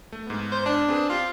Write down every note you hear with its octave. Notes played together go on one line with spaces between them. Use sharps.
A3
G#2 B3
C5
D4
C4 G#4 B4
C4 F4 G4